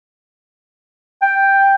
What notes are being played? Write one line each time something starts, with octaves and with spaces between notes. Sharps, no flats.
G5